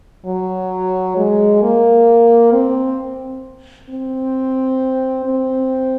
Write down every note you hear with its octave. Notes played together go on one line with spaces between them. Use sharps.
F#3
G#3
A#3
C4
C4
C4